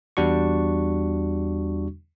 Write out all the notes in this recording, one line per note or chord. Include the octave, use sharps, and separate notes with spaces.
E2 G3 D4 F#4 C#6